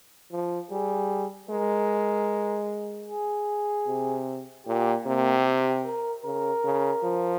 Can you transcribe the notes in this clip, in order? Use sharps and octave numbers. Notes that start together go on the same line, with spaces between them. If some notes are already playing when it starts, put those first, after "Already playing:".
F3
G3 G#4
G#3 A#4
G#4
C3
A#2 G4
C3 A#3
G4
A#4
C#3 A#4
C#3
F3